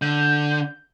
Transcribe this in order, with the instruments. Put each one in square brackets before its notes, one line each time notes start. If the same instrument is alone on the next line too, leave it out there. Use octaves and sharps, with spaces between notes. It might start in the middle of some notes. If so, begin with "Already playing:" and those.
[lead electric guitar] D3 [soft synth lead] G6